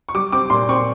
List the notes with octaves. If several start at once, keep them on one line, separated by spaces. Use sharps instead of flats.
C#6
G3 D6
C4 D6
A#2 C6
C4 C#6